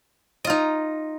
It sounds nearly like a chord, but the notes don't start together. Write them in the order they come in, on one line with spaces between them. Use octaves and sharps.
D#5 F4 D#4